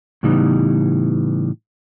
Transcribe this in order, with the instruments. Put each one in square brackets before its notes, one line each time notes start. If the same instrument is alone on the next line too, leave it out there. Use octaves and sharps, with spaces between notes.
[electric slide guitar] A2 C#3 E3 G3 B3 D#4